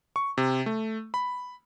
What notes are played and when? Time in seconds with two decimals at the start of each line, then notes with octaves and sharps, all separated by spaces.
0.16 C#6
0.38 C3
0.66 A3
1.14 B5